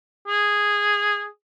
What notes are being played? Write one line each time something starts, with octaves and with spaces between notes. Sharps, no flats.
G#4